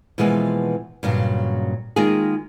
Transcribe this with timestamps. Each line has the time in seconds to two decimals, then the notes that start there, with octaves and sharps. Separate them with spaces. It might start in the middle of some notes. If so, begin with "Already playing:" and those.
0.18 B2 E3 F3 G#3 A#3 B3
1.03 G2 A#2 C#3 F#3
1.96 D#3 G#3 A#3 F4 G#4